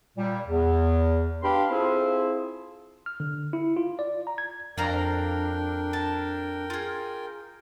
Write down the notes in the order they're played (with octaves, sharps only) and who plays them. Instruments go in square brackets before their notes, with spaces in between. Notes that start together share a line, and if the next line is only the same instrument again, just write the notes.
[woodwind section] A#2 G3
E2
D4 G4 B4 F5 B5 C6
C4 E4 F4 G#4 A4 C5
[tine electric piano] F6
D3
E4
F4
D5
A#5
G#6
[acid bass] F2 [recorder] D4 [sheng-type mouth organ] A#4 G5 [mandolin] D5 F5 A#5
[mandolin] A5
F4 G#4